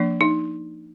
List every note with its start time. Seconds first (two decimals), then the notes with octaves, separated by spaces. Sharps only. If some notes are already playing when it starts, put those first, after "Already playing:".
Already playing: F3 A#3 D4
0.21 D#4